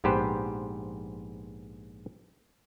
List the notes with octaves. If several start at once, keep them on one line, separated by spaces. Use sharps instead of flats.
A#1 G#2 B3 G4 B4 C5